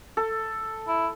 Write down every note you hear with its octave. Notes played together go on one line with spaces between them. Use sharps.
A4
E4